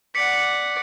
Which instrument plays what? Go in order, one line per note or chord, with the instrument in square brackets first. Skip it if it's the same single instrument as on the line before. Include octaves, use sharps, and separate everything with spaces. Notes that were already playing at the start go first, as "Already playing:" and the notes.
[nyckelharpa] D5 F#5 [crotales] B6 C#7